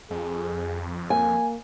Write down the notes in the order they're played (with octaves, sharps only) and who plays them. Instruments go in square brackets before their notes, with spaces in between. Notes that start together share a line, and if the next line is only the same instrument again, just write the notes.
[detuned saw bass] F2 [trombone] G#4
[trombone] A#3 [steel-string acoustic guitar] G#5